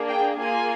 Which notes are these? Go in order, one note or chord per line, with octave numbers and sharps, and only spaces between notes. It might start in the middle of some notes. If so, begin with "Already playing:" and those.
Already playing: A#3 D4 G#4
G5
A#3 F4 G#4 G#5